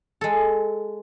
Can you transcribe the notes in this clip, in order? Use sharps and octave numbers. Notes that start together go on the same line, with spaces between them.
G#3 A4